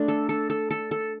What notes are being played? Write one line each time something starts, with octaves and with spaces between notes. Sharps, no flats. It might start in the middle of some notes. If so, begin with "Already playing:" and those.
Already playing: A3 D4
A4
A4
A4
A4
A4